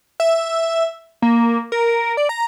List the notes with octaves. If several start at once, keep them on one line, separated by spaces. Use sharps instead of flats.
E5
A#3
A#4
D5
A#5